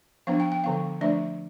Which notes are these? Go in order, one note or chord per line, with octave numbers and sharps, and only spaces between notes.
F3 B3 D4 F5
G5
G5
D3 F3 B3 F5
F3 A3 D4 E5